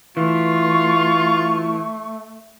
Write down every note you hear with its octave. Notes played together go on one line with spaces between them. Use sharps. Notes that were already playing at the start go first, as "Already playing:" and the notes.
E3 A3 F4 C#6